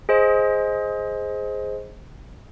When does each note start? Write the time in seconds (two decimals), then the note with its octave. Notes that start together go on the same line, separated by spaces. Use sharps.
0.09 G#4 C5 D#5